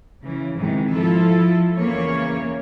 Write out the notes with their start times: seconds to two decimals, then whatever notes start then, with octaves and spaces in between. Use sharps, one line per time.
0.22 C#3 E3
0.56 G#2 C3 D#3 E3 G#3
0.94 F3 E4 F4 A4
1.75 E2 C#3 E3 A#3 C#5